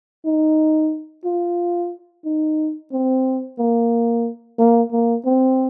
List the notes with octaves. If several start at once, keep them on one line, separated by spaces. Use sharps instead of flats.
D#4
F4
D#4
C4
A#3
A#3
A#3
C4